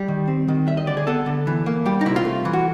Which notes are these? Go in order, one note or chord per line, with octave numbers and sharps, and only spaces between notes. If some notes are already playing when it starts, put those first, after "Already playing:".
Already playing: G3
D#3
C4
D#3
G3 E5
D#5
D3 D5
G#4
B3 A4
D3
E3
A#3
G3 G4
D#4
C3 E4
F4
A3
E3
F#4